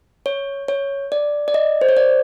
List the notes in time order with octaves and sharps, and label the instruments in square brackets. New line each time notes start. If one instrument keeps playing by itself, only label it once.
[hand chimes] C#5
C#5
D5
D5
D#5
C5
C#5
D5